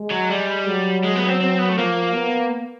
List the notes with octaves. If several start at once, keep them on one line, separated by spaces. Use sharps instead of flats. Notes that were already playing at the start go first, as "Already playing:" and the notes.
Already playing: G#3
F#3
G3
F#3
G#3
B3
C#4
C4
C4
B3
A3
F3 A#3
B3